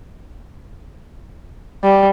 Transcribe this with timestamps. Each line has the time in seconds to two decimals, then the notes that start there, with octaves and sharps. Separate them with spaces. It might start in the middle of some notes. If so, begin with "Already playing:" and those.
1.84 G3